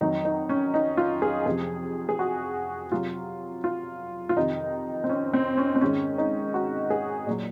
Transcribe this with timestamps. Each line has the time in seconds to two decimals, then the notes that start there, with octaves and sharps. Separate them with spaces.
0.01 F2 D#3 F#3 D#4
0.25 D#4
0.49 C#4
0.74 D#4
0.97 F4
1.22 G#4
1.46 F2 C3 F3 G#4
2.09 G#4
2.19 F#4
2.92 C3 F#3 F4
3.64 F4
4.29 F4
4.36 F2 C3 D#3 D#4
5.04 C4
5.09 C#4
5.34 C4
5.58 C#4
5.75 C4
5.81 G#2 D#3 G#3 C#4
6.18 D#4
6.54 F#4
6.90 G#4
7.27 A#2 F#3